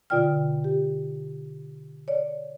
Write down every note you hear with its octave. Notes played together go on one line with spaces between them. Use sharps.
B2 D3 F4 D5 G5 F6
G4
C#5 D5